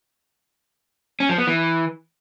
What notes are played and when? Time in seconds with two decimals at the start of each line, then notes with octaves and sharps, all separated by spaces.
1.20 C#4
1.29 F3
1.38 B3
1.47 E3